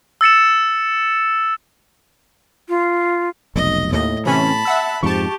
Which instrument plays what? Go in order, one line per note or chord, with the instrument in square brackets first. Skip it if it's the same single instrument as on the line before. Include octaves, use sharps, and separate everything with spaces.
[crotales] E6 A6 C#7 E7
[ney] F4
[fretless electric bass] F1 B1 [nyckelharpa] D#5
[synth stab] D#2 [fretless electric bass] A2 [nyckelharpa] D#5
[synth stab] C3 E3 C#4 [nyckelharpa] A5 B5
[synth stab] E5 F#5 E6
[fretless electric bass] F2 G#2 F3 [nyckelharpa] G4 [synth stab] A5 C#6